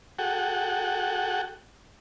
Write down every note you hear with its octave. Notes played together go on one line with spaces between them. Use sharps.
F#4 G#4 A4 F#5 G5